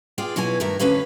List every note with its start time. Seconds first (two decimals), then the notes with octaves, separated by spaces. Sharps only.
0.18 F4 G#4 D5 G5
0.36 B2 F#3 E4 F4 G#5
0.60 G2 D#3 A3 F#4 A#4 E5
0.80 F2 A2 D3 C#4 B4 F5